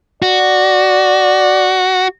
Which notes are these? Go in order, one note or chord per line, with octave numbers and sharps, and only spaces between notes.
F#4 D5